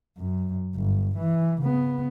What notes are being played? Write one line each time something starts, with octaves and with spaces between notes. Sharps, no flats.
F#2
G1
E3
C#3 B3